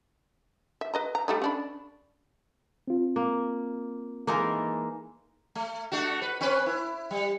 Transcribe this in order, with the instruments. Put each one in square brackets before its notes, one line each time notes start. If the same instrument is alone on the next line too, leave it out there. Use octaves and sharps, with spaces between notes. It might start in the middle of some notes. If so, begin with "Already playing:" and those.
[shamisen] E5
B4 D#5 A#5
A#5
G3 A3 D#4
C#4 D4 B5
[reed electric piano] C4 F4
[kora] A#3
[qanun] E3 G#3 A4 [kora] A#3 D#4 A#4
[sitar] A3
A3 D4 F#4
B4
C4 C#4 B4
E4
G3